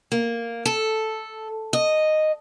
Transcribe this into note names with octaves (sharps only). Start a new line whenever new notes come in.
A#3
A4
D#5